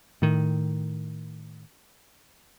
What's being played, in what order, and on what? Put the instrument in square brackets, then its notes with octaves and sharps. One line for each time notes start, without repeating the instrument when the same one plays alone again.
[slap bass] A2 D#3